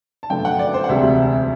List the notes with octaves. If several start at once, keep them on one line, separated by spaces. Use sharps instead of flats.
A5
G1 F#2 D3 A3 G5
F#5
D5
C5
F#5
E1 D2 C3 G3 E5